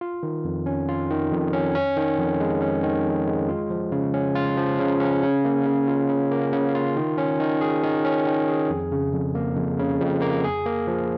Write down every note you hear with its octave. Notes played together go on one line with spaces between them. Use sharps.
F4
D#3
F2
C#4
F4
D#3
F2
C#4
C#4
D#3
F2
G#3
C#4
D#3
F2
G#3
F4
F3
C#3
C#4
F4
F3
C#3
C#4
C#3
A#3
C#3
F4
C#3
A#3
C#3
F4
D#3
C#4
D#3
G#4
D#3
C#4
D#3
G#4
F2
C#3
F2
A#3
F2
C#3
F2
A#3
G#4
A#3
F3